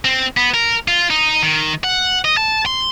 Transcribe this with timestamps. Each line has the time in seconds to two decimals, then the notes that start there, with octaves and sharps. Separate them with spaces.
0.05 C4
0.37 B3
0.54 A#4
0.88 F4
1.10 D#4
1.43 D#3
1.84 F#5
2.25 D#5
2.37 A5
2.66 C6